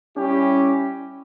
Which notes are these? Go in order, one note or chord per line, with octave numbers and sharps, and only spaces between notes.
G3 C#4 E4 G4